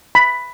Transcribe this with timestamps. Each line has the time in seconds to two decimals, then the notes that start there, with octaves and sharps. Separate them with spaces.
0.15 B5